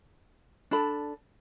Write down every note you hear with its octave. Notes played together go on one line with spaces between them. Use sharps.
D4 A4 B5